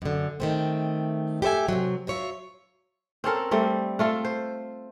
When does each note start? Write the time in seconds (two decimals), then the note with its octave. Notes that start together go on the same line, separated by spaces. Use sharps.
0.02 F#2 D3
0.40 D#3 A3 C4
1.42 G4 A4 C5 E5 G#5
1.69 C3 D#3 F#3
2.07 F#3 F4 C#5 E5
3.24 C4 C#4 A4 A#4
3.51 G3 A3 C4
3.99 A3 F4 A4
4.25 C5